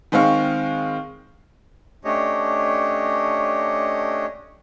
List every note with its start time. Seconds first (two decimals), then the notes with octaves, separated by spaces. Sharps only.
0.12 D#3 G#3 C4 F5 C#6
2.05 A3 C#4 D4 G4 C#5 D#5